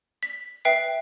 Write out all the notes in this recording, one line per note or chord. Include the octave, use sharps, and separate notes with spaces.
B6
B4 E5 G5 C7